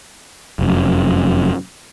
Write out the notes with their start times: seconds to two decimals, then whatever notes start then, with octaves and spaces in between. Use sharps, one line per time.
0.59 F1 F#2